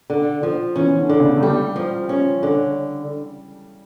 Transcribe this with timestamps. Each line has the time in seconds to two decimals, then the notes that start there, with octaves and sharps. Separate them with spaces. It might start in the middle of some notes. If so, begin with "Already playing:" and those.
0.10 D3
0.43 F3
0.76 E3 C#4
0.98 D3
1.09 D3
1.20 C#3
1.37 A3
1.43 G3 G4
1.76 F3
2.09 C#4
2.43 D3